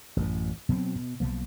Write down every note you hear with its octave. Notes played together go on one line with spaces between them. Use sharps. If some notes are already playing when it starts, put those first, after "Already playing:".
A1 F#2
B2 F#3 G3 C4
B2
B1 B2 F3 A#3